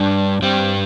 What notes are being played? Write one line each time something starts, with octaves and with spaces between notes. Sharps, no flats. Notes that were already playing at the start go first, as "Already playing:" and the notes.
Already playing: G2 G3 D4
G2 G3 C4